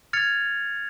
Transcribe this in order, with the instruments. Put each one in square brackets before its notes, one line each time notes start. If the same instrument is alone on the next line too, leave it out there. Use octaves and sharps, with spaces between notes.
[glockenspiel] F6 G#6 A6 C#7 F7